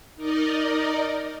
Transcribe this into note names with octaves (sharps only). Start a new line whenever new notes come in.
D#4 A#4 D5 D#5